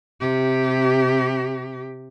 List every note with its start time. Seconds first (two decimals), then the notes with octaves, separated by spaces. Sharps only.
0.20 C3 G4